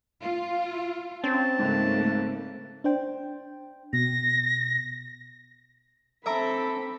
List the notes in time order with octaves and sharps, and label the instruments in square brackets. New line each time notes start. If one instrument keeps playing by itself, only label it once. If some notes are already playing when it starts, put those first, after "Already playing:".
[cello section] F4
[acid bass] C4 [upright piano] C#4 [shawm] A5
[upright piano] C#2 G#2 [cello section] C#3 A3 A#3
[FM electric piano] D4 C5 G5
[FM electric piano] B2 [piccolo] A#6
[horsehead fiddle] C4 B5 [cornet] A4 [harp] E5 A#5 D6